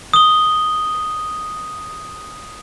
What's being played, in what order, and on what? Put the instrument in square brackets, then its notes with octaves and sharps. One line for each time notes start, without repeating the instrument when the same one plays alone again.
[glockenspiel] D#6 G7